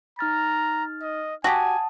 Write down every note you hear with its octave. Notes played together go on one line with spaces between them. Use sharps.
D#4 A#5 F6 A6
D#5
F#4 G4 F#5 G#5 A5 D#6